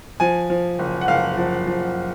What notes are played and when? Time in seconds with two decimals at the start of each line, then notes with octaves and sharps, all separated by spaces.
0.20 F3 G#5
0.50 F3
0.79 F#1
1.01 F#5
1.08 F#1 F5
1.37 F3
1.67 F3